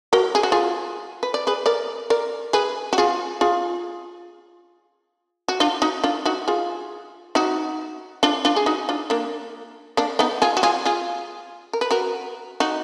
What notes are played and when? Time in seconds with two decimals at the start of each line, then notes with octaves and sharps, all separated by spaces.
0.13 F#4 A#4
0.35 G#4
0.43 F#4
0.52 F4 G#4
1.23 B4
1.34 D5
1.47 G#4 B4
1.66 A#4 D5
2.10 A#4 D5
2.53 G#4 B4
2.93 F#4
2.98 F4 G#4
3.41 F4 G#4
5.48 F#4
5.60 D4 F4
5.82 D#4 F#4
6.04 D4 F4
6.25 D#4 F#4
6.48 F4 G#4
7.35 D#4 F#4
8.23 D4 F4
8.45 D4 F4
8.56 G#4
8.66 D#4 F#4
8.89 D4 F4
9.10 A#3 D4
9.97 A#3 D4
10.19 B3 D#4
10.42 F4 G#4
10.57 F#4
10.63 F4 G#4
10.85 F4 G#4
11.73 A#4
11.81 B4
11.91 F#4 A#4
12.60 D#4 F#4